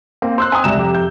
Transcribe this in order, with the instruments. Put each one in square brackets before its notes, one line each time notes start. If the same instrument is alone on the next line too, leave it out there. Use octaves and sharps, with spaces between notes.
[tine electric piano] A#3 [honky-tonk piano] C4
[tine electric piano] C5 [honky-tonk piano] C6 E6 F#6
[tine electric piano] C4 [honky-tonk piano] G#5 D#6
[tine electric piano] C#2 G3 [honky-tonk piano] C3 A#5 E7
[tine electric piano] F2 G4
[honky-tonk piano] G6